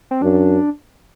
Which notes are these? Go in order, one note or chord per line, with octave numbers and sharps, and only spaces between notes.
C4
F#2 D4